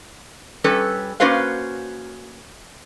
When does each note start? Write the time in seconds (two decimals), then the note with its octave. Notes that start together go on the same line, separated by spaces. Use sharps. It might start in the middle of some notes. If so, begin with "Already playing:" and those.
0.64 G3 C#4 A4 B4
1.20 A#3 C#4 F#4 B4 C5 F5